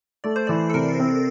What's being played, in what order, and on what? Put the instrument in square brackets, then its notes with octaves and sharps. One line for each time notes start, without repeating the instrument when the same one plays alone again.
[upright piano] A3 [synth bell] D5
[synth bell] C5
[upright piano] E3 [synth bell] D5
[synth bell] A4
[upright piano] C3 [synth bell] A#4
[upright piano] C4